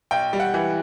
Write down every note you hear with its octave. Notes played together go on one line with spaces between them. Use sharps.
B1 G5
G3
F#5
E3